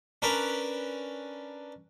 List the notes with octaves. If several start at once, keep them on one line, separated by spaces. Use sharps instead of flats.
C#4 D4 A#4 B4